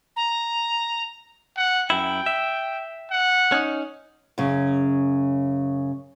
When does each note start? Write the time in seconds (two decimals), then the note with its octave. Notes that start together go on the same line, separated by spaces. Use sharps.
0.16 A#5
1.57 F#5
1.90 F#2 E4 G5
2.26 E5
3.11 F#5
3.52 C#4 D#4
4.38 F#2 C#3